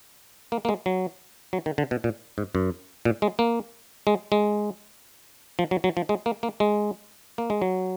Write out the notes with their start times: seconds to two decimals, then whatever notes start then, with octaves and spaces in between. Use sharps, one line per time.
0.52 A#3
0.65 A#3
0.69 G#3
0.86 F#3
1.53 F#3
1.66 D#3
1.78 D3
1.91 B2
2.04 A#2
2.38 G#2
2.55 F#2
3.05 A#2
3.22 G#3
3.39 A#3
4.07 G#3
4.32 G#3
5.59 F3
5.71 F#3
5.84 F#3
5.97 F3
6.09 G#3
6.26 A#3
6.43 A#3
6.60 G#3
7.38 A#3
7.50 G#3
7.62 F#3